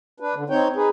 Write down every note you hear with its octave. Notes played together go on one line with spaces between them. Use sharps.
D4 B4
D3
C4 D#4 C#5 G5
D#4 G#4 B4